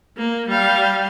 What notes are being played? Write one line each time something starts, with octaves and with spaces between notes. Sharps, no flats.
A#3
G3 F5